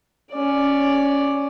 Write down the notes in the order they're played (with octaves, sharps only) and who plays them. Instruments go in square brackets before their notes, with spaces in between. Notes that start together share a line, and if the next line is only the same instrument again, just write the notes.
[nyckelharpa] C#4 D5